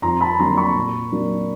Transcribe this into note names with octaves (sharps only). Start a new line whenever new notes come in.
F2 A#5 C6
A5 B5
D3 F#3 A#3 A#5 C6
B5 C#6
A#2
F#3 A#3 D4